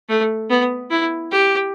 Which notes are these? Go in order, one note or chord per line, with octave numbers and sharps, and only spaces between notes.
A3
B3
E4
G4